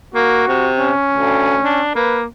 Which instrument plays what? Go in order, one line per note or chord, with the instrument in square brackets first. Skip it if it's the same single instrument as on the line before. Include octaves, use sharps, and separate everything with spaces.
[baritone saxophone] A#3 [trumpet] F#4
[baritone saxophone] C3
[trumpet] C#4
[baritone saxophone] D2
D4
[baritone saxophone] A#3 [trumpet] B4